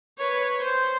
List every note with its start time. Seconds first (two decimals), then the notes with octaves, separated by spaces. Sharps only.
0.18 B4 C#5
0.59 C5